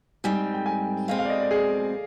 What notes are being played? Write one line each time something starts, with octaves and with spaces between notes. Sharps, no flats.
G#2 G3 C4 G#5
G5
G#5
B2 G#3 C4 F5
F5
D5
D#5
D5
G#4